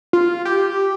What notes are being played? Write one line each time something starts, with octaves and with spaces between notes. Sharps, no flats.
F4
G4